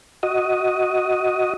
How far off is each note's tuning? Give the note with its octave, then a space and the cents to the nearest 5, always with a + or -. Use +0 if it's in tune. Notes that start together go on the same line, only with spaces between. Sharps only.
F#4 +0 D#5 +10